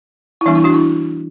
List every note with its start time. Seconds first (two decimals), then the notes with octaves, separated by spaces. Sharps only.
0.41 E4
0.46 E3 G3 B3 D4
0.55 E4
0.64 D4 F#4
0.74 E4